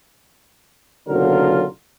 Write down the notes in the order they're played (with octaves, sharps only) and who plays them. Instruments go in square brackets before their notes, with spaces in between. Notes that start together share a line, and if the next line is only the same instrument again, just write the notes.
[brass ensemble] F#1 B1 D3 F#3 F4 A#4